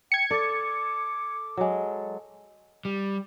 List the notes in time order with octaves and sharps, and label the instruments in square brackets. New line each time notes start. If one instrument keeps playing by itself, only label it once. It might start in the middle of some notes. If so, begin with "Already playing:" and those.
[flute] G5 [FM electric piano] G#6 C#7
[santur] A4 [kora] D5 [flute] D6
[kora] F#3 G#3
[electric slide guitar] G3